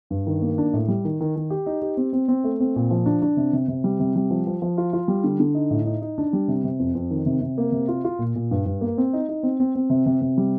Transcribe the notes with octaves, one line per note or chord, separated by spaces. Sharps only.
G2
D#3
A#3
D4
A2
G3
D#3
D#3
D#3
G4
D#4
G4
C4
C4
C4
A3
C4
A#2
F3
D4
D4
C3
C3
C3
G3
C3
G3
F3
F3
F3
F4
F4
G3
D3
D3
D#4
A2
D#4
D#4
D4
G3
C3
C3
F2
F2
D#3
C3
C3
A#3
C3
F4
F4
A#2
A#2
G2
G2
A#3
C4
D#4
D#4
C4
C4
C4
C3
C3
C3
G3